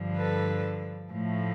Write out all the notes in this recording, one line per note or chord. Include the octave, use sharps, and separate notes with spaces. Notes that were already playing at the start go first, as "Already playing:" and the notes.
Already playing: G2 D3 F3
A4 B4
A2 F3 A3